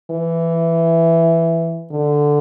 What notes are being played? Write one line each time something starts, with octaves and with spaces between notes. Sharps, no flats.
E3
D3